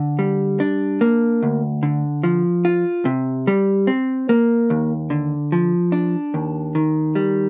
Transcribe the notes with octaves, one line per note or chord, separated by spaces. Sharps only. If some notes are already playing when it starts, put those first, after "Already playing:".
Already playing: D3
G3
D4
A#3
D2
D3
F3
F4
C3
G3
C4
A#3
D#2
D3
F3
D4
D#2
D#3
G3